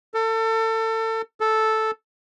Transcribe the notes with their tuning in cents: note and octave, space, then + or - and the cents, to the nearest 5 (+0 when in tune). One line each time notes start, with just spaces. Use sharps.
A4 +30
A4 -5